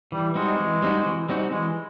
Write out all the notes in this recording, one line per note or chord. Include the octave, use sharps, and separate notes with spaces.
E3 G3
G3 G#3 C4 D#4 F#4
E3
G3 C4 D#4 F#4
E3
G3 C4 D#4 F#4
E3 G#3